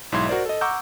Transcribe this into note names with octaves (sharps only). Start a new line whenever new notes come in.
B1 G#2 E4 E5 C6 G#6
F#4 A#4 C5 D5
A4 D#5
F#5 A#5 C#6 D6 E6 G6